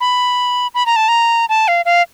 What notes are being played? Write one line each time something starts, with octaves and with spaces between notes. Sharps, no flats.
B5
B5
A#5
A5
A#5
A5
F5
F5